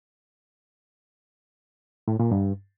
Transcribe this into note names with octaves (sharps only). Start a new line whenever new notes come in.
A2
A#2
G2